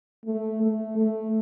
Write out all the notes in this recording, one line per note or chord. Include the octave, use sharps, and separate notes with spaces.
A3
A3
A3